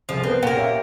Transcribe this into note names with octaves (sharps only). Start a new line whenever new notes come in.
C2 F3 G#4
B3 C4 A#4
A#2 A#4 F5 F#5
G4 C#5 E5